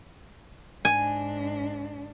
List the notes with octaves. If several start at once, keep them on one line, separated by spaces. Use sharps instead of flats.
G#2 D4 G#5